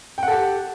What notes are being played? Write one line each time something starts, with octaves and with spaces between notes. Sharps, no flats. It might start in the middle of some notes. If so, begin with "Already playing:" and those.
G4 A4 F#5 G5